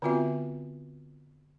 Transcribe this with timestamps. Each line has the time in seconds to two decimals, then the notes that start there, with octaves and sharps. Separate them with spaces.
0.02 D3 B3 C4 F4 F#4 E5